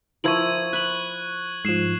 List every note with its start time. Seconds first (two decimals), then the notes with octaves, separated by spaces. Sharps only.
0.24 F3 E4 A#4 C#6 G#6 F#7
0.73 B5 F#6 F#7
1.65 G#2 F3 C7 E7